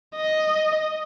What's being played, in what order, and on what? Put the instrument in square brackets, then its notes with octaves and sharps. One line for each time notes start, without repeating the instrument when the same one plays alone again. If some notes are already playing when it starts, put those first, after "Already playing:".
[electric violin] D#5